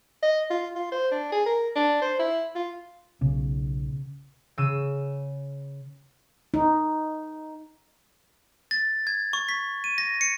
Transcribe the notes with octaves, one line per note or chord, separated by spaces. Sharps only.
D#5
F4
F4
C5
D4
G#4
A#4
D4
C5
E4
F4
B1 C#3
C#3 E6 D#7 E7
D#4
A6
G#6
C#6
B6
D#7
A#6
C#7